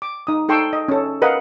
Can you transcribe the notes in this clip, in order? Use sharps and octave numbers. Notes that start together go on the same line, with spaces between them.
D6
D#4 D#6
D#4 A4 G5 C6 C#6 E6
D#5
C#4 A4
A#4 B4 D#5 F5 F#5